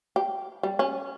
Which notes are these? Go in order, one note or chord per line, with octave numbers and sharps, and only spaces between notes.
G4
G3
C#4